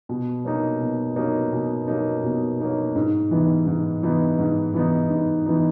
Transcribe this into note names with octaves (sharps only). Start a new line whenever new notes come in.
B2
F#3 A#3 D#4
B2
F#3 A#3 D#4
B2
F#3 A#3 D#4
B2
F#3 A#3 D#4
G#2
E3 B3 D#4
G#2
E3 B3 D#4
G#2
E3 B3 D#4
G#2
E3 B3 D#4